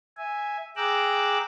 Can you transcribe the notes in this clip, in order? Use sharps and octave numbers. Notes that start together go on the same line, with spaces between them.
E5 G#5
G#4 G5 A#5 D6 E6 F#6